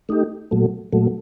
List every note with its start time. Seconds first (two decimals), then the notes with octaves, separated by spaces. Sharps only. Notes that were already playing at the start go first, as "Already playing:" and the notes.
0.09 A3 D#4 G4
0.51 A#2 F#3 A3
0.93 A#2 F#3 A3